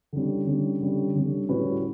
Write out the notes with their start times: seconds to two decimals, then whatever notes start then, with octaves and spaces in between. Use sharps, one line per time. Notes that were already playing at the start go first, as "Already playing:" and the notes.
0.13 D3 G3 C#4
0.47 D3 G3 C#4
0.81 D3 G3 C#4
1.15 D3 G3 C#4
1.49 A2 G3 C#4 F#4 B4